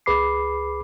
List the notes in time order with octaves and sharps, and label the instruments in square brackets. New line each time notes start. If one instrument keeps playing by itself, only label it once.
[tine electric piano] C#2 G#4 B4 B5 D6 C7